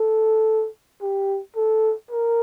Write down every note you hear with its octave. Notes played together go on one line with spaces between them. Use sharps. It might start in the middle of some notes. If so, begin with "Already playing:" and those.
Already playing: A4
G4
A4
A#4